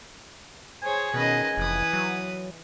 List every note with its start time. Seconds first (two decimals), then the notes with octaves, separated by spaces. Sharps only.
0.83 G#4 C5 C#5 G#5
1.14 B2 D#3 C#4 G#4 B4 D#5
1.57 F1 E3 B4 D#6
1.93 F#3